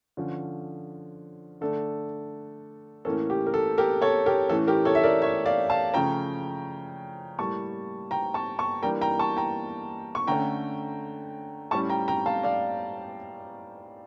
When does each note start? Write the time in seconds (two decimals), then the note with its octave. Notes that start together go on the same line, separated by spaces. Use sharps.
0.17 D3 F3 C#4
1.61 D3 A3 D4 A4
3.05 A2 E3 A#3 C#4 A4
3.30 G4
3.46 A#4
3.54 A4
3.78 G4 A#4
4.02 A4 C#5
4.26 G4 A#4
4.49 A2 E3 A3 C#4 A4
4.67 G4 A#4
4.85 A4 C#5
4.95 E5
5.03 A#4 D5
5.22 C#5 E5
5.46 D5 F5
5.70 F5 A5
5.94 C#3 F3 A3 C#4 G5 A#5
7.39 A2 G3 A#3 A5 C#6
8.11 G5 A#5
8.34 A5 C#6
8.59 A5 C#6
8.83 E3 G3 A#3 D4 G5 A#5
9.01 G5 A#5
9.19 A5 C#6
9.37 G5 A#5
10.15 C#6
10.27 D3 A3 C#4 G5 A#5
11.71 A2 G3 C#4 A5 C#6
11.89 G5 A#5
12.08 G5 A#5
12.26 F5 A5
12.43 D5 F5